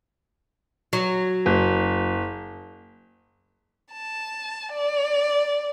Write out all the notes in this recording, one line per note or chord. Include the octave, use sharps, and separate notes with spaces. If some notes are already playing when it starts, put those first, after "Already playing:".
F#3
F#1
A5
D5